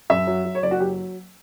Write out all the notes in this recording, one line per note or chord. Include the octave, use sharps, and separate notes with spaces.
F#2 E5
F#3
F#3
C#5
F#1 D5
F#4
F#3 G4